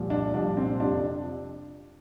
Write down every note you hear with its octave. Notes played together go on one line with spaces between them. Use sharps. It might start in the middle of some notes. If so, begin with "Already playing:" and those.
Already playing: C2 A#2 F3
D4
C2 A#2 F3 D4
C4
F2 C3 F3 D4